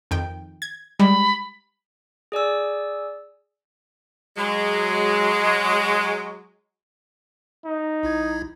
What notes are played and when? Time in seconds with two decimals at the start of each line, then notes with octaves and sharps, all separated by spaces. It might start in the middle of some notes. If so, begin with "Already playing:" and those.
0.11 F2 D#3 G5
0.62 G#6
1.00 G3 G#3 B5
2.32 G#4 D5 G#5 E6
4.37 F#3 G#3
7.65 D#4
8.03 B1 E4 G#6